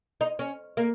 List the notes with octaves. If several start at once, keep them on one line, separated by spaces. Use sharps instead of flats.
D#4
C#4
A#3